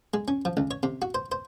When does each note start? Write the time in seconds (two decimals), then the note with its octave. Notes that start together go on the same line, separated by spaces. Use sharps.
0.14 G#3
0.28 C#4
0.45 F3
0.57 C#2
0.71 C#5
0.83 C3
1.02 F#4
1.15 C5
1.32 C5